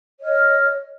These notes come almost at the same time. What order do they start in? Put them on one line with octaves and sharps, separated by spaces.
C#5 D#5 F6